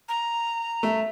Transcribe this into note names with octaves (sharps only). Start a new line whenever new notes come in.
A#5
A3